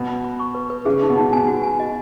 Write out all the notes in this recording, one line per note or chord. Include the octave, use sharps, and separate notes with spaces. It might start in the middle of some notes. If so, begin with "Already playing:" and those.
Already playing: B2
B5
B5
C#6
B4
B4
C#3 G#4
D#4
B2
D#4
B2 G#5
F#4
G#5
D#5